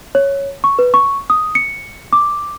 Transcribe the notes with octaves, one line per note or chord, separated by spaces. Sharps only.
C#5
C#6
B4
C#6
D#6
C#7
D6